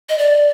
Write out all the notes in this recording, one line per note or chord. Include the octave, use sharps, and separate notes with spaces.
D#5
D5